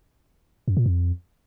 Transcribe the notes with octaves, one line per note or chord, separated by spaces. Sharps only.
F#2
A#2
F2